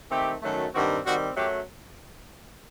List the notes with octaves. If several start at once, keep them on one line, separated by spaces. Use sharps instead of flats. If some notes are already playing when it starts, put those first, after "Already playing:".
D#3 A3 C4 G4
F#2 D#3 F#3 A3
G2 D#3 G3 C4 F#4
D#3 G3 C4 F#4
F#2 F#3 A3 G4